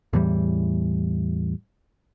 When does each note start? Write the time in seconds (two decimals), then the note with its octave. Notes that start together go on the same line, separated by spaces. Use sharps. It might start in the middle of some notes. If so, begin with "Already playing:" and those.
0.13 E2 A2 E3 G3